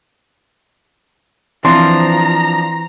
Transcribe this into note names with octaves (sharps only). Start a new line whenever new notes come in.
E3 F3 C4 D4 A#5 C6